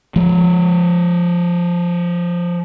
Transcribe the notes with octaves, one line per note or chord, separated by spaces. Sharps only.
F3 G#3